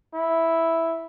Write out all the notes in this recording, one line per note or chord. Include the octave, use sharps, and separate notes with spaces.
E4